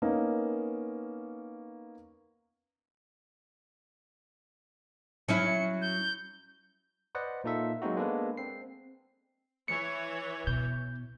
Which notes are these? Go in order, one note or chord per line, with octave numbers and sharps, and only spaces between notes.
A#3 B3 C#4 D#4
F#3 C#4 E4 C#7
G6
B4 C5 D5 D#5 F#5
A#2 A#3 D#4 F4 A4 E5
F#3 G#3 A#3 C4 D#4 F#4
G#3 A#3 B3 D4 A4 B4
C4 C7
E3 C#5 C#7
B2 G6